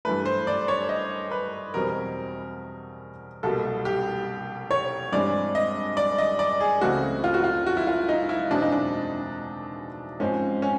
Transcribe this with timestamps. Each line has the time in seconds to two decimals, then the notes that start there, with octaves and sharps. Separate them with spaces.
0.05 G2 E3 A3 B4
0.25 C5
0.47 D5
0.68 C#5
0.89 D#5
1.31 B4
1.74 E2 B2 G3 C4 A#4
3.43 C2 B2 G3 A#3 A4
3.85 G4
4.71 C#5
5.12 G2 E3 G#3 C4 D5
5.55 D#5
5.97 D5
6.18 D#5
6.39 D5
6.60 G#4
6.81 C#2 C#3 E3 A3 C4 F#4
7.24 F4
7.34 F#4
7.44 F4
7.66 F#4
7.77 E4
7.87 F4
8.09 D#4
8.29 E4
8.51 E2 B2 G#3 C4 D4
8.62 D#4
8.72 D4
10.20 G#2 F3 G#3 C4 C#4
10.62 C#4